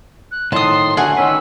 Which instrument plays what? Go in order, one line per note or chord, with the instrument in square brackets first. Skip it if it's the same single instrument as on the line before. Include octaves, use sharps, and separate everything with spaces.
[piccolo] F#6
[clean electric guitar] A2 D#3 F3 [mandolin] A5 D#6 [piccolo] C6
[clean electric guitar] D2 A3 C#4 [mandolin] G#4 F#5 [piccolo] G#5
[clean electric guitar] D#3 C#4 B4 [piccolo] E6